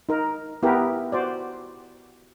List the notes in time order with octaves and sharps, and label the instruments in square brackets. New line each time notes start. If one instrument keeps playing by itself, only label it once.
[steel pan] D#4 A#4
B3 E4 G4 A#4
F#4 C5 D5